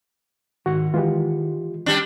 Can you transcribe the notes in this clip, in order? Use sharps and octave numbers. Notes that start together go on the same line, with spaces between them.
G#2 D#3 F#4 F#5
E3 G#3 F4 G4
G3 D4